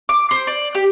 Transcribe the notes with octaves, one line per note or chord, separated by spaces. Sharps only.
D6
C5
D5
G4